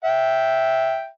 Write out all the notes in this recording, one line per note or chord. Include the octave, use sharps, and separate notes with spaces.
E5 G5